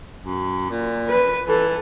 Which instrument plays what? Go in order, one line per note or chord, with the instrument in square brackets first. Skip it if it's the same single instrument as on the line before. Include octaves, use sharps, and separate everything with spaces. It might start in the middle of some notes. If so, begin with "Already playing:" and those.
[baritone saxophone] F#2
A#2
[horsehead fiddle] B4
[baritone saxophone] E3 [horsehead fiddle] A4